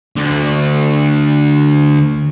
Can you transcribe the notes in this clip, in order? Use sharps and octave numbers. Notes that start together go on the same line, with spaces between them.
D2 D3